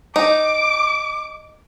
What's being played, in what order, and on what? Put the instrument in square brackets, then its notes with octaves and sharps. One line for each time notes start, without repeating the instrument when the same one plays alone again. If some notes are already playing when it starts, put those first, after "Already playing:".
[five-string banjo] D#4 [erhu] D6